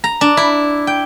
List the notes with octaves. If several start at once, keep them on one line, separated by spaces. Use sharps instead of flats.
A#5
D4
E4
G5